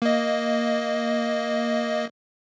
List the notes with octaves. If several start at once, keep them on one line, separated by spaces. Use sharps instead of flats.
A#3 D#5